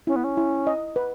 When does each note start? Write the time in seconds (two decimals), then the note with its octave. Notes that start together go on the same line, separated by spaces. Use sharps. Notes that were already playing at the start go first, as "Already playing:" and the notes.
0.07 C#4 E4
0.16 B3
0.24 C#4
0.37 E4
0.67 D#5
0.96 B4